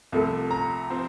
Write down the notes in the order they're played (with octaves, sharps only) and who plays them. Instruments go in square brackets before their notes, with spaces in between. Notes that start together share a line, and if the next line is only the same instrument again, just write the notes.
[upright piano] C2 C3 F3 A3
[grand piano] A#5
[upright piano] F3 C4